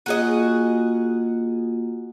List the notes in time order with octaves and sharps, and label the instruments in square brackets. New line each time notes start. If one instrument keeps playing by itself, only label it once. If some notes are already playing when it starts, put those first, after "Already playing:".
[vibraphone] A#3 F4 [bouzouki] F#4 G#4 D#5